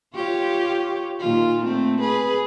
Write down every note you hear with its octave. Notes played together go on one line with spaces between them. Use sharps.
F4 G4 C#5
A#2 D#3 F4
A3 C4
G#4 B4